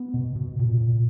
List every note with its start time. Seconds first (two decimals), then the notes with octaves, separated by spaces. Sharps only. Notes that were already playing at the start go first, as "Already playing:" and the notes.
Already playing: B3
0.14 B2
0.36 B2
0.59 A#2
0.81 A#2